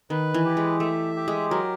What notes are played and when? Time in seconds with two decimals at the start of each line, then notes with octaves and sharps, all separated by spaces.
0.10 D#3 B4
0.34 E3
0.45 G4
0.57 G#3
0.80 A3 E5
1.16 G4
1.28 G#3
1.50 F#3 A#4